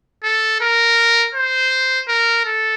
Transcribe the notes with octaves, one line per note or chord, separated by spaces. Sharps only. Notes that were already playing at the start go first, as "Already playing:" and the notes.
A4
A#4
C5
A#4
A4